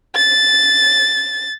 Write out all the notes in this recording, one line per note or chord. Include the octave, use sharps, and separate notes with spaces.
A6